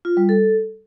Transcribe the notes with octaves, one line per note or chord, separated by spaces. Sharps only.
F4
G3
A4